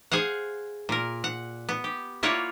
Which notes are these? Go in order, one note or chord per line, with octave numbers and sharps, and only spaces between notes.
G#4 C5 F5 F#5
A#2 A#4
F#5
B3
G4
A#3 E4 F4 C#5 D5 F#5